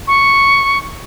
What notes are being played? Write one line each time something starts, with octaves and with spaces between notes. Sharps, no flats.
C#6